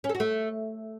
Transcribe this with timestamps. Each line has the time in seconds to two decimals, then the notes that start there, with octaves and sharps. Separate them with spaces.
0.04 C#4
0.09 A4
0.15 F#4
0.20 A3